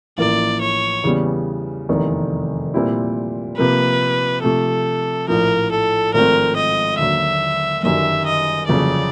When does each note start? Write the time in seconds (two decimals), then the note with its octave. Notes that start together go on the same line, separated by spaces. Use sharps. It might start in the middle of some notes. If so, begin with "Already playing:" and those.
0.18 A1 A2 F3 A#3 D5
0.61 C#5
1.04 E2 C#3 E3 G3 B3
1.89 F1 E2 C3 D#3
2.74 A#2 G3 C4 E4
3.58 C3 F3 A#3 B4
4.44 C3 F3 A3 A4
5.28 A#1 A2 F3 A#4
5.71 A4
6.14 G#1 G#2 F3 A3 C4 A#4
6.56 D#5
6.99 D#2 D3 F#3 E5
7.83 G1 F#2 D#3 G3 E5
8.26 D#5
8.69 G1 F2 C#3 F#3 D5